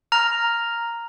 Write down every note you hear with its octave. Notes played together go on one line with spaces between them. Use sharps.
A#5 F6